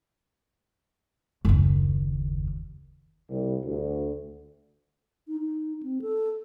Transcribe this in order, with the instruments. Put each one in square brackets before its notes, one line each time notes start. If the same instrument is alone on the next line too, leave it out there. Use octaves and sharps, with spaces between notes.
[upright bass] F#1 D#2
[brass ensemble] C2
D2
[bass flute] D#4
D#4
C4
A4